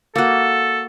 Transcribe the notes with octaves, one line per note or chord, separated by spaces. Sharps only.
A#3 F#4 A4